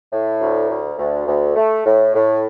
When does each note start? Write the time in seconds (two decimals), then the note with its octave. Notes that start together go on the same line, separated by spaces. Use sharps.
0.12 A2
0.41 D2
0.70 D2
0.98 D2
1.27 D2
1.56 A3
1.85 A2
2.14 A2